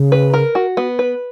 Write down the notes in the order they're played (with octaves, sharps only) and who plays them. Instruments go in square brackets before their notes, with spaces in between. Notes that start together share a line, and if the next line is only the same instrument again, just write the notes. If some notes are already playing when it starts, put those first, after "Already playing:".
Already playing: [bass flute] C#3
[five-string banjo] B4
A#4
F#4
B3
B4